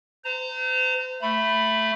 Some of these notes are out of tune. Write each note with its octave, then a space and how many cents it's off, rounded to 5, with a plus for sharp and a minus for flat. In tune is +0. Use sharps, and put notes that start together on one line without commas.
C5 -40 A#5 -25
A3 +5 B5 +0